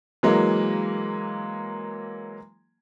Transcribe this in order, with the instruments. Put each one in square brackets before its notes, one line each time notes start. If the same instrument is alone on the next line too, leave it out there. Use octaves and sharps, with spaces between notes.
[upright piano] E3 F#3 G#3 A#3